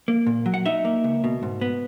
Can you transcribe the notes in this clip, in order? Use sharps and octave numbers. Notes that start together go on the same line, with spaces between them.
A#3
A#2
F#3
F#5
D#4 E5
A#3
C#2
B2
G#2
B3